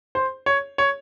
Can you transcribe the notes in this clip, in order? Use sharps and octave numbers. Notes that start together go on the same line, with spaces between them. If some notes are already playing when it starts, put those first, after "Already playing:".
C5
C#5
C#5